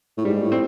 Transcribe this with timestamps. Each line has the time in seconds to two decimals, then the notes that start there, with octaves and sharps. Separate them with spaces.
0.18 A2
0.25 G#2 G3
0.43 A2
0.52 C4